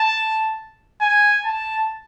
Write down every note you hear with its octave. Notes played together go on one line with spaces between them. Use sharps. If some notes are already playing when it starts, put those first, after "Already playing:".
Already playing: A5
G#5
A5